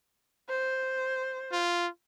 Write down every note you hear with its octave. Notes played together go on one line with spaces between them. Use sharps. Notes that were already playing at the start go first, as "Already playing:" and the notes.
C5
F4